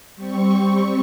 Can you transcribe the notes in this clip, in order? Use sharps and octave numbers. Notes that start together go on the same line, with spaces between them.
G3 C4 C#6